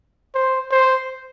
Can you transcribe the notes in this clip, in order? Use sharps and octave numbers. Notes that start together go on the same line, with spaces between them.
C5
C5